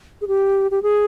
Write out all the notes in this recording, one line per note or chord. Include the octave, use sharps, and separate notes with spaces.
G#4
G4
G4
G#4